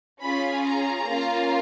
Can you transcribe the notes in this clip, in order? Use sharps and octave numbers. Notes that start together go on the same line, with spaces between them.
C#4 F4 G#4 B5
A#5
A#3 C#4 F4